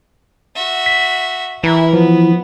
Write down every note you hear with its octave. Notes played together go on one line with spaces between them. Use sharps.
F#4 E5
B6
E3 E4 A#4
F3 B3